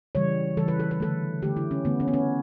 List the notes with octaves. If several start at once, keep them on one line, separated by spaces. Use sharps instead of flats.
C#3 E3 G3 C#5
C#3 E3 G3 A4
B4
A4
B4
D3 A3 A4
D3 A3 G4
E4
C#4
D3 A3 B3
C#4
B3
C#4